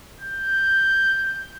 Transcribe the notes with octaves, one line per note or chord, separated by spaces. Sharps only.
G6